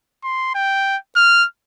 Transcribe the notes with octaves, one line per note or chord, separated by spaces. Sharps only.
C6
G5
F6